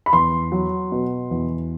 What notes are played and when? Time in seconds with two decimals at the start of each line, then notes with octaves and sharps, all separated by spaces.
0.06 B5
0.13 E2 C6
0.52 F#3
0.92 B2
1.31 E2